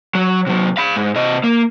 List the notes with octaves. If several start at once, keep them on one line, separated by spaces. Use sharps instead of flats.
F#3
C3 F#3
F5 B5
G#2
C3 D#5
A#3